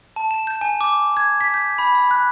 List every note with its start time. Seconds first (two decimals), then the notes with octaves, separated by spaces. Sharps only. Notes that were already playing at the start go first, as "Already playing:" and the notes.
0.16 A5
0.31 E7
0.47 G6
0.61 G#5
0.81 D6
1.17 G#6
1.41 B6
1.54 G6
1.78 B5
1.95 B5
2.11 F#6